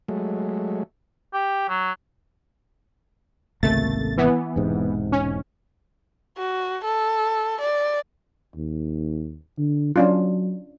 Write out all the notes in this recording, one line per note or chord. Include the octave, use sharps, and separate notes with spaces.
F#3 G#3 A3
G4
F#3
G#1 C#2 C3 A3 A#3 A6
E3 B3
E1 G#2 C3
C#4
F#4
A4
D5
D#2
D3
F#3 C#4 D4 F4